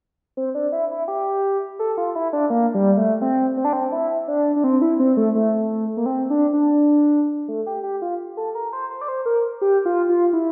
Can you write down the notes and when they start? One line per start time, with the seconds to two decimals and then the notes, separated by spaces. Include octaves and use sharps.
0.37 C4
0.55 D4
0.72 E4
0.91 E4
1.08 G4
1.79 A4
1.97 F4
2.15 E4
2.33 D4
2.50 A#3
2.74 G3
2.97 A3
3.21 C4
3.57 C4
3.65 D4
3.73 C4
3.92 E4
4.28 D4
4.56 D4
4.64 C4
4.82 E4
5.00 C4
5.17 A3
5.35 A3
5.97 A#3
6.06 C4
6.30 D4
6.53 D4
7.48 A3
7.67 G4
7.83 G4
8.02 F4
8.37 A4
8.55 A#4
8.73 C5
8.90 C5
9.01 D5
9.08 C5
9.26 A#4
9.62 G4
9.85 F4
10.09 F4
10.33 E4